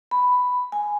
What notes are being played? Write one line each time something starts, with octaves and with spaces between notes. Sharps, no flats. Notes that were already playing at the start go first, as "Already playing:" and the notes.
B5
G#5